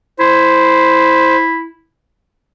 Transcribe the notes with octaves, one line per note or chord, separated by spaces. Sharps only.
E4 C5